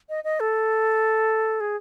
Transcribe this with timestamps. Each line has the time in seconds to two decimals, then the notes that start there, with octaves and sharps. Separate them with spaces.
0.09 D#5
0.24 D#5
0.40 A4
1.60 G#4